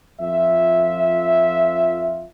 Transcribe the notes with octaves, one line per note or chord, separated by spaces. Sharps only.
F2 F3 F4 E5